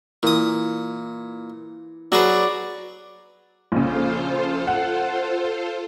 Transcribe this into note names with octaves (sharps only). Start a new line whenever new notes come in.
A#2 E3 D#6
F#3 F#4 G#4 B4 D5
A#1 C#3 F4 A4 C5
F#5